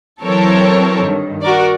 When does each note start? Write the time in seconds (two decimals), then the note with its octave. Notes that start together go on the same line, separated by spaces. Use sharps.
0.22 E3 F#3 C4 A4 A#4 C#5
1.02 G2 D#3
1.42 F#4 A#4 D5